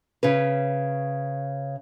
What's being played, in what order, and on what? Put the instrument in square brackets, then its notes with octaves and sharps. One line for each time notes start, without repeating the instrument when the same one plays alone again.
[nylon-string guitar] C#3 C#4 B4